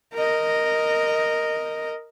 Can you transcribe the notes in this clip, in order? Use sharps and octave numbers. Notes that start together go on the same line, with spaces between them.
A#4 D#5